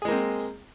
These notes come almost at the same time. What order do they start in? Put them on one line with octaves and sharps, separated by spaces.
G#4 G#3 A#3 C4